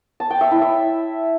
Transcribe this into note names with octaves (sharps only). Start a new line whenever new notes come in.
A5
G5
E5
E4
E5